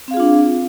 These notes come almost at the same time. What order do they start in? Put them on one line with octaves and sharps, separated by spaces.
C4 F5 G#4 F4 D4